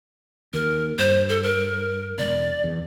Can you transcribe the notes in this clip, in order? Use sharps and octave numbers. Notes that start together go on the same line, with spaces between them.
D#2 A#4
G2 C5
A4
A#4
E1 D5
E2